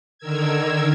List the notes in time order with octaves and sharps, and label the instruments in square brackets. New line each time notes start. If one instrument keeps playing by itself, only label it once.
[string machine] D3 D#3 A#4 E6 G#6